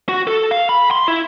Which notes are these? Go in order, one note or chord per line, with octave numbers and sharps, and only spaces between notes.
F#4
A4
F5
B5
C6
E4